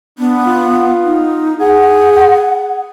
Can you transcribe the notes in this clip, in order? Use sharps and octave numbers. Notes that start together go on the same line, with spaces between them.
B3 D4
F4
D#4
G#4 F#5